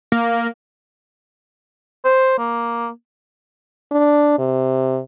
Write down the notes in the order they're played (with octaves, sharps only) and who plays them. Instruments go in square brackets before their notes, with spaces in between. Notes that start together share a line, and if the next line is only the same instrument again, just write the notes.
[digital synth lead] A#3
[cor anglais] C5
A#3
[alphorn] D4
C3